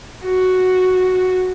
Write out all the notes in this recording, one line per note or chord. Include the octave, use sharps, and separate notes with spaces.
F#4